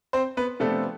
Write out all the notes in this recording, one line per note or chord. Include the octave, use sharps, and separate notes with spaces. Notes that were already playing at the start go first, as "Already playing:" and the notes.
C4 C5
B3 B4
C3 F3 A3 B3 D4 A4